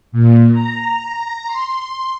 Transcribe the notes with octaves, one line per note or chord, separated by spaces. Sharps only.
A#2
A#5
C6